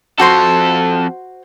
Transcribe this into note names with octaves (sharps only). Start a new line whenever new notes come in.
F2 F#4 A4 C5 C6